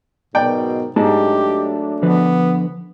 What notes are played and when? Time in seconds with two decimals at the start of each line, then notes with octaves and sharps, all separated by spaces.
0.35 G#2 B2 F#3 A#4 D5 G5
0.96 G#2 F#3 A3 D4 G4 D#5 A5
2.02 D3 F3 B3 B4